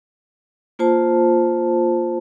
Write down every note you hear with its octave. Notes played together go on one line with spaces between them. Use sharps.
A#3 F4 C5 A5